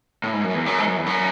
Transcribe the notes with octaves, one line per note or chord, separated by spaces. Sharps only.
A2
G#2
F#2
E2
F#2
G#2
F#2
E2
F#2